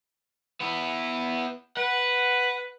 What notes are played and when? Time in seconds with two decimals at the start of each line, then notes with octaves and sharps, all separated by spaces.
0.60 B3 E4
1.77 B4 F#5